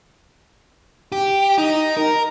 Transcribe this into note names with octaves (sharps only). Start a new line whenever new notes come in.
G4
D#4
A#4